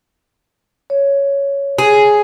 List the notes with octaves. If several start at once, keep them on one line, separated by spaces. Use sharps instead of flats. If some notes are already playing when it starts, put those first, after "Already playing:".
C#5
G#4